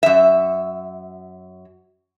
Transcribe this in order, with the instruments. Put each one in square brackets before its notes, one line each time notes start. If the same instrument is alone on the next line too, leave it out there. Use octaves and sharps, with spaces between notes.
[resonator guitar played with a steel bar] F#2 E5